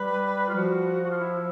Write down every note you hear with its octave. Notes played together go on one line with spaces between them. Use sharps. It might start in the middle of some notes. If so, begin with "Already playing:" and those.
Already playing: G3 B4
F4
F3 F#4
F#4
F4
E4